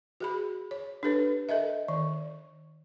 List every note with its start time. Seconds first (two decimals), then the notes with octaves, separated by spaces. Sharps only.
0.20 F#4 G#4 B5
0.71 C#5
1.03 D4 G4 A4 B4
1.49 A4 A#4 D#5 E5
1.88 D#3 D5